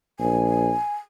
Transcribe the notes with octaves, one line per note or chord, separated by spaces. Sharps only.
A#1 G#5